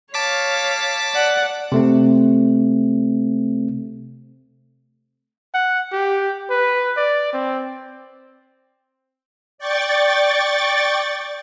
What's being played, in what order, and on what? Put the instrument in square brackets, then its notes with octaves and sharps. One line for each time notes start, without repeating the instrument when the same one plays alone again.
[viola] C#5 F5 [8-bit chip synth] A5 D6 B6
[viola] D5 F#5
[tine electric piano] C3 A3 C4
[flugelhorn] F#5
G4
B4
D5
C4
[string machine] D5 G5 C#6 A6